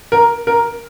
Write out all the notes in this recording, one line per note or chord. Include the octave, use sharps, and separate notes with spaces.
A#4
A#4